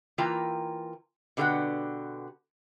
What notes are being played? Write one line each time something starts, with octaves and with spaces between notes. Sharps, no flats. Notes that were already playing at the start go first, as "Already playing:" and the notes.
E3 A#3 F4 G5 A#5
B2 D3 F4 G4 B4 F#5